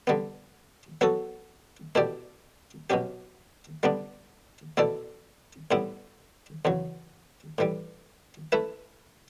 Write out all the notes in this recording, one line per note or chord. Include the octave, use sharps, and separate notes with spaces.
D3 G3 B3
F#3 B3 F#4 A4
B2 A3 E4 G4 D5
B2 F#3 C#4 G4
D3 G3 B3 D4
B2 A3 E4 A4 D5
A2 G3 B3 E4
E2 C#3 F#3
A2 E3 G3
A3 E4 B4 E5